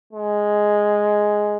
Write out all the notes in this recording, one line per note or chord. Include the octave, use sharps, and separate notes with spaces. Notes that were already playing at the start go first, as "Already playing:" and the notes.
G#3